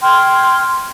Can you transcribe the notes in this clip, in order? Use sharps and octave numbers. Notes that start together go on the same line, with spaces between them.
G5 C6 F6 G#6